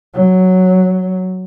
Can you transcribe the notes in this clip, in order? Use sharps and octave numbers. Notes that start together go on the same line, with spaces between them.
F#3